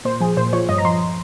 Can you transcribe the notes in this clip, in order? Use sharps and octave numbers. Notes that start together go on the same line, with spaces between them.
A#2 C5
F3 G#4
A#2 C5
F3 C#5
G2 D#5
A#5
F3 C6